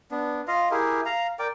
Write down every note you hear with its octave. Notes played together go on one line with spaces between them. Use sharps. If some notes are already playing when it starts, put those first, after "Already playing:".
B3 D4
F4 D#5 F5
E4 G4 G#4 A#4
F5 A#5
A#4 D5 G5 D6